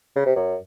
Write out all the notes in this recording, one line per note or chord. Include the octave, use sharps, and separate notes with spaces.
C#3
C3
F#2